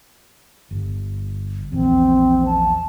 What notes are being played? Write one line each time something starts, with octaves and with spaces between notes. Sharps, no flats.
G1
A#1 E2 C4
A5